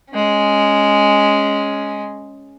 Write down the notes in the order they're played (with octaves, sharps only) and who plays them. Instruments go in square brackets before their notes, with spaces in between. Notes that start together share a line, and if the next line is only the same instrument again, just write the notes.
[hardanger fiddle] G#3 C#4